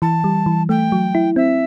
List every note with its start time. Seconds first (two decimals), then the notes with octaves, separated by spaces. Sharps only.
0.02 E3 A5
0.24 G3
0.46 E3
0.69 A3 G5
0.92 F#3
1.15 E4
1.36 C4 E5